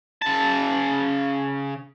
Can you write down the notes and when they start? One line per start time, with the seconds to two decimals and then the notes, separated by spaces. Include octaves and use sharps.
0.22 C#3 A5